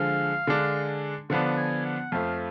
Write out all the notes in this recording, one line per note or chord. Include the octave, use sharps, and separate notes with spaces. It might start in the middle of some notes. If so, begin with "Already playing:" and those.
Already playing: D3 F3 G#3 F5
D3 G#3 D4
D3 F3 B3 D4 F#5
G#5
F#5
F2 F3 A3 F5